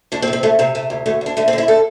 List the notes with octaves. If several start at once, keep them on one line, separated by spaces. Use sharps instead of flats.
D2 D4
C4
C3
C4
D2 A3
C3 C4
C3 A3
D2
D2 A3
D2 D4
D3 A3
C4
D3
E4
D3 A4